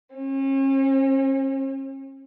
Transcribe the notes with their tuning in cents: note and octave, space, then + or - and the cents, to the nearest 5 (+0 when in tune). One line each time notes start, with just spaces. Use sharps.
C#4 -40